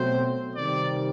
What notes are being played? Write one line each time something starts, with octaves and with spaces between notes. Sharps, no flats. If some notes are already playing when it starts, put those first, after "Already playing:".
Already playing: B2 F#3 A3 C4 C5
C3 D#3 G3 C4 D5